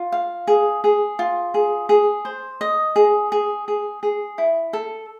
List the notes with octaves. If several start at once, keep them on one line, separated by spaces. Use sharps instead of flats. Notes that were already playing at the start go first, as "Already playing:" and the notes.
Already playing: F4
F5
G#4
G#4
F4
G#4
G#4
C5
D#5
G#4
G#4
G#4
G#4
E4
A4